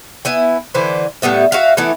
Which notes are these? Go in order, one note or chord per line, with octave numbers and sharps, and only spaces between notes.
B3 E4 G#5
D3 E3 B4 C5
A2 G3 B3 E5
F#4 E5 F5
E3 A3 B3 E4